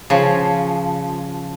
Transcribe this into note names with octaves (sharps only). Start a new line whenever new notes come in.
C#3 F3